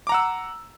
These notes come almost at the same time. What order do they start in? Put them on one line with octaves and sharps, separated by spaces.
D6 A#5 F#5 E6